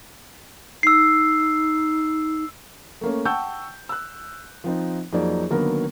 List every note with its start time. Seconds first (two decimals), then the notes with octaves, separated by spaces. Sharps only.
0.83 D#4 E6 C7
3.01 A3 A#3 C#4
3.25 F#5 G5 A5 C#6 E6 G6
3.89 E6 F#6
4.64 F3 C4 D#4
5.13 F2 F#3 A#3 D#4 G#4 D5
5.50 D3 D#3 F#3 A#3 B3 A#4